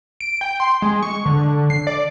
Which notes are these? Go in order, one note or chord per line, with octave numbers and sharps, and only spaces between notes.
D7
G5
C6
G#3
C#6
D3
C7
D5